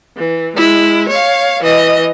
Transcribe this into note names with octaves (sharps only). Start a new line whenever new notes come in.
E3
G#3 E4
C#5 F5
E3 D#5